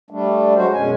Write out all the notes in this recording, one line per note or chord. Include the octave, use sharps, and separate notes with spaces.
G3 A3 D4
F#3 G#3 F#4 C5
F#2 B2 G#3 C#4 G#5